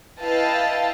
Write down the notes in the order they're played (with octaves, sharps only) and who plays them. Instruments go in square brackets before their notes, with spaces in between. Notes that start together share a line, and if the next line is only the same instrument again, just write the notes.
[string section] E4 B4 D#5 F5 G5 A5